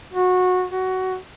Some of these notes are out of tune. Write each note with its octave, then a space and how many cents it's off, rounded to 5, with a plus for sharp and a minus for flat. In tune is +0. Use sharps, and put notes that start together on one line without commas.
F#4 -20
F#4 +15